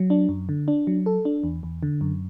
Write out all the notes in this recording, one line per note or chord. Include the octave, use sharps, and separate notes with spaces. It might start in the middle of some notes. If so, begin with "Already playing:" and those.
Already playing: F#3
D4
F#2
D3
D4
F#3
A4
D4
E2
E2
D3
F#2